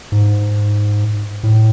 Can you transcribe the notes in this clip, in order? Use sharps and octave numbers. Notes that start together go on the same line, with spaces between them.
G#2
A2